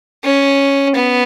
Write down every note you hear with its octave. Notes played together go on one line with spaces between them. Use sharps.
C#4
B3